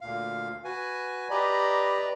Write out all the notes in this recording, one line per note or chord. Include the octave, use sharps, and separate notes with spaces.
D2 A#2 F5
F#4 B4 G#5
G4 B4 D5 D#5 A#5 B5